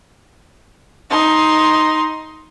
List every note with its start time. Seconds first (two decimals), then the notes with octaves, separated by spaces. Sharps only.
1.10 D#4 C6